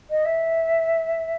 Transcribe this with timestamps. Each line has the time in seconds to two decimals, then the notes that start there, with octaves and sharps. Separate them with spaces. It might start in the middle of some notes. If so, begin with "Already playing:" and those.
0.09 D#5
0.25 E5